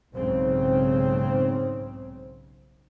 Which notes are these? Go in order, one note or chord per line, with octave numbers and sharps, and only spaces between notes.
B1 G#2 C#3 C4